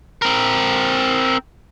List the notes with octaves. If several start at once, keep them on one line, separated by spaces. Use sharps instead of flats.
C4 A#4